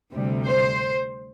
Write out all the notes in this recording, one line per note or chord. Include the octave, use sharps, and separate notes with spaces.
D2 C3 G3
C5